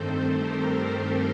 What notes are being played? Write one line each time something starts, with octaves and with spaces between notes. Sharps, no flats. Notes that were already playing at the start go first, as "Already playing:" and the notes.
Already playing: G2 D#3 A3 C4 A4 C5
G4 A#4